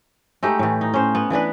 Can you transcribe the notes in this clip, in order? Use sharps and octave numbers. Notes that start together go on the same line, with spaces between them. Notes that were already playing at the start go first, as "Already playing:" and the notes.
G#3 A3 D#4 G4
A2 E3
D#4
C#4 C5
B3
E3 B3 D4 B4